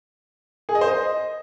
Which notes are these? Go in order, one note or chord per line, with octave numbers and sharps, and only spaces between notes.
G#4
D#5
C5
D#5